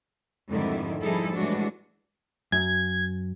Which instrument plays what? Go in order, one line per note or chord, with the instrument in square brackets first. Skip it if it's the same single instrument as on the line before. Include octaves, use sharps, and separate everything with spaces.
[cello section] F2 G#2 D3 D#3 G3 E4
F3 G3 D#4 E4 G#4 A4
A2 E3 G3 G#3 D4 F#4
[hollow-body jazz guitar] F#2 [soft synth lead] G#6